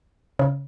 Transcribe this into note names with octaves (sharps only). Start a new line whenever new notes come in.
C#3